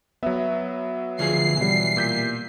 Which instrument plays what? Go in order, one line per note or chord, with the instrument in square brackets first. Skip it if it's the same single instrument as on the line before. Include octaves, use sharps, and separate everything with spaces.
[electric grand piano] F#3 B3 [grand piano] E5
[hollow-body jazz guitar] D2 F3 G#4 [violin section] C7
[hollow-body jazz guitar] B2 [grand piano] E3 G3
[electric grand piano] A#2 G6 B6